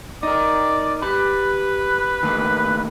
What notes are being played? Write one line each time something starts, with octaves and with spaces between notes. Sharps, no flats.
D#4 A#4 D5
G4 B4 B5
D#3 A3 A#3